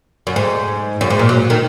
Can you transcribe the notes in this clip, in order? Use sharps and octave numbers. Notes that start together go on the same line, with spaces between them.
F#2
G#2
F#2
G#2
A#2
F#3
D#3